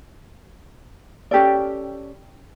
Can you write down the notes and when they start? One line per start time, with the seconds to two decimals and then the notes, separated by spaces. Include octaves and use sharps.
1.31 C#4 G4 A4 D5